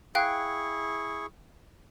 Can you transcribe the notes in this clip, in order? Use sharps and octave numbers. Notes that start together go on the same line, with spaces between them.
E4 G#4 F5 G5 C#6 F#6